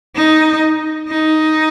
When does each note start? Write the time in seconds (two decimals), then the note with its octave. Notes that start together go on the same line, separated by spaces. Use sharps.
0.16 D#4
1.08 D#4